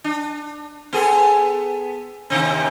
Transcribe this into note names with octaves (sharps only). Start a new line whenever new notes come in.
D4
B3 G#4 A4
D#2 C3 C4